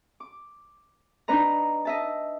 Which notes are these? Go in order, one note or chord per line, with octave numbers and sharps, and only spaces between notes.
D6
D4 D#4 B4 D#5 A#5
D#5 E5 A5